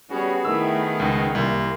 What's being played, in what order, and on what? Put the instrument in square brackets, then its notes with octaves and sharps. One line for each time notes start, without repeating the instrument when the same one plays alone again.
[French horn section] G3 C#4 [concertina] B3 G#4 [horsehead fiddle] F#4
[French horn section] D#3 [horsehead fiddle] A3 E4 [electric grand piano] E6
[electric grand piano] C#2 [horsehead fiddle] D#4
[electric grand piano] C2 [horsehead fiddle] A#3 E4